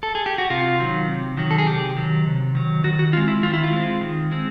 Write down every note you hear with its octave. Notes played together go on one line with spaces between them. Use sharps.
A4
G#4
G4
F#4
C3 F4
D#3 F#3
C3
D#3 F#3
A4
G#4
C3 G4
D#3 F#3
C3
D#3 F#3
D#3 F#4
F#4
G#3 C4 F4
E4
D#3 F4
E4
F4
G#3 C4
D#3
G#3 C4